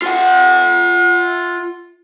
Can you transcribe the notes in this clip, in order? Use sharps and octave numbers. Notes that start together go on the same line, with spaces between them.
F4 F#5